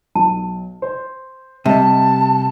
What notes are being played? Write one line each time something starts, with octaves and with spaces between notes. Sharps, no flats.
B1 A5
C5
C3 G3 D#5 E5 A5